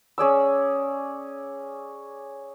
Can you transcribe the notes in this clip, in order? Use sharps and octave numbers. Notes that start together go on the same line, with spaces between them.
C#4 G#4 D5 E6